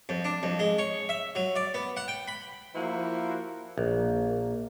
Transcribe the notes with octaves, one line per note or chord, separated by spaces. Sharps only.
F2
D4
F2
G#3
C#5
E5
F#3
D5
B3
F#5
G5
B5
F3 A#3 E4 F#4 C5 F5
A#1 A#3